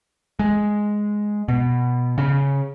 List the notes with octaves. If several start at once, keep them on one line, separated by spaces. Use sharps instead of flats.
G#3
B2
C#3